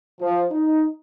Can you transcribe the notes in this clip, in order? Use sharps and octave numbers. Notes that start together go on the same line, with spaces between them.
F3
D#4